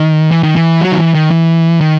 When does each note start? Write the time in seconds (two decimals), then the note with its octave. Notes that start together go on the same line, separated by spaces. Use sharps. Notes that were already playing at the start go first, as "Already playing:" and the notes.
Already playing: D#3
0.31 E3
0.43 D#3
0.56 E3
0.81 F#3
0.92 D#3
0.98 E3
1.14 D#3
1.31 E3
1.81 D#3